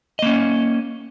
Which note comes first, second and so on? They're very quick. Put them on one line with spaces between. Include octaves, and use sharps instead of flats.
D#5 A#3 C#4